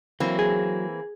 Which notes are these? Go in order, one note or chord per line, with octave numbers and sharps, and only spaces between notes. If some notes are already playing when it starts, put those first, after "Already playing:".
E3 F#3 A#3 C4
G#4